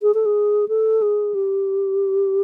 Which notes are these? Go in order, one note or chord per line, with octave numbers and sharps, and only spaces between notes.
G#4
A4
G#4
A4
G#4
G4